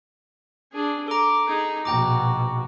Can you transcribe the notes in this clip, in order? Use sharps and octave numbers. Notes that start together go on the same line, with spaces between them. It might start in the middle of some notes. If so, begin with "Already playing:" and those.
D4 G#4
A4 A#5 D6
D#4 G#4
A#1 B2 F#4 G5 A#5 D6